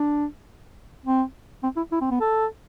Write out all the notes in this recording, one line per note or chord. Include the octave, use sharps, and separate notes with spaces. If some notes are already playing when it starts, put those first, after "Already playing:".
Already playing: D4
C4
C4
E4
E4
C4
B3
A4